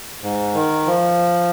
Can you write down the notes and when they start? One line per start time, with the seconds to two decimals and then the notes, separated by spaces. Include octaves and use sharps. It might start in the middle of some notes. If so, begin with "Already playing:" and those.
0.22 G#2
0.55 D#3
0.87 F3